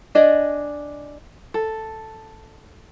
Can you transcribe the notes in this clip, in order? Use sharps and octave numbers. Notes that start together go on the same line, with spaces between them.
D4 G#4 D5 D#5
A4